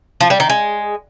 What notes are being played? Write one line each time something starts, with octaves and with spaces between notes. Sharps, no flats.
F3
G3
D#3
G#3